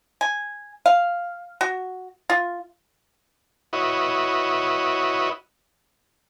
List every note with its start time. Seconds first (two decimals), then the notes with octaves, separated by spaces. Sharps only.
0.21 G#5
0.86 F5
1.61 F#4
2.30 F4
3.73 E4 F#4 B4 C#5 D#5